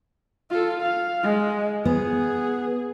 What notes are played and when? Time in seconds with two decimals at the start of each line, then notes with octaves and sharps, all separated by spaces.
0.50 F4 A4
0.82 F5
1.23 G#3
1.85 B3 G#4